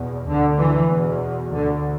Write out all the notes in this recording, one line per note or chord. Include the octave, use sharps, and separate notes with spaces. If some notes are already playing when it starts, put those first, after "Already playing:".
Already playing: E2 B2
D2 D3
E3
E2 B2
D2 D3